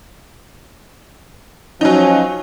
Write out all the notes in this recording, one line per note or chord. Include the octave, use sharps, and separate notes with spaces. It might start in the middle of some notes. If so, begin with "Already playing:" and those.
F3 F#3 C#4 D#4